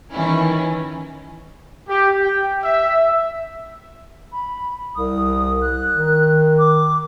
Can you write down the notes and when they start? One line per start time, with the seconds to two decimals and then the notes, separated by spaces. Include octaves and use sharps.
0.11 D#3 E3 C#4 E4
1.89 G4
2.21 G5
2.63 E5
4.32 B5
4.95 C2 D#6
5.62 F#6
5.95 D#3
6.58 D6